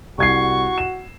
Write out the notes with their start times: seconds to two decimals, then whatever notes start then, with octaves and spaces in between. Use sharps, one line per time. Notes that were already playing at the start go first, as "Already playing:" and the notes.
0.18 C2 F#4 C#6 G#6 C7
0.78 E7